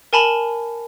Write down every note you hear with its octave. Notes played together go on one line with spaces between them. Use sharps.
A#4 G#5 A5 B5 E7 F7